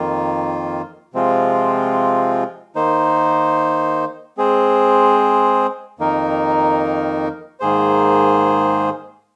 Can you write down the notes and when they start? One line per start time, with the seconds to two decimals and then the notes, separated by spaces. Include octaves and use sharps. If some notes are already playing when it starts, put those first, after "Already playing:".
Already playing: F2 D#3 A#3 F4
1.14 C3 F3 G#3 C4 F4
2.76 D#3 A#3 D#4 C5
4.37 G#3 C4 G#4 C5
5.99 F2 D#3 A#3 D#4 A#4
7.60 G#2 D#3 A#3 G#4 C5